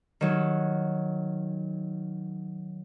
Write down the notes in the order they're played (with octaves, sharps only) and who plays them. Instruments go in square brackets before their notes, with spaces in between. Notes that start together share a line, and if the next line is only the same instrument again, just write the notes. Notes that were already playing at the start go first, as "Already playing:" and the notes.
[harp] D#3 F#3